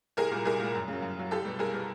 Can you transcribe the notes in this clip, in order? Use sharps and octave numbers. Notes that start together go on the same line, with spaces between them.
C2 G#4 A#4
A#2 G3
C2 G#4 A#4
A#2 G3
F#2
C#3 F#3
F#2
C#3 F#3
C2 G4 A4
B2 G3
C2 G#4 A#4
B2 G3